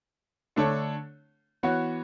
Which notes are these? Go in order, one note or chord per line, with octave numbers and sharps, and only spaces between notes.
D3 A3 D4 A4 C#5
E3 B3 F#4 C#5